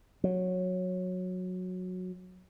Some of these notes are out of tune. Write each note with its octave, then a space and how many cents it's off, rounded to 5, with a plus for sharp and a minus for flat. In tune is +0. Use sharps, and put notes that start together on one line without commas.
F#3 -15